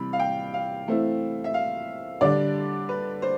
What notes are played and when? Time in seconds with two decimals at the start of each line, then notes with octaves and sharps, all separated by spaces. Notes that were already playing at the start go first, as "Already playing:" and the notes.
Already playing: C3 E3 G3 B5
0.13 F5
0.19 G5
0.54 F5
0.86 E3 A3 C4 E4
1.44 E5
1.54 F5
2.21 D3 G3 D4 D5
2.89 B4
3.22 C5